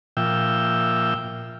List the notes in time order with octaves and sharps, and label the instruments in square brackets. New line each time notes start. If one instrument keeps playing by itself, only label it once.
[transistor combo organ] A#2 F3 E5 G5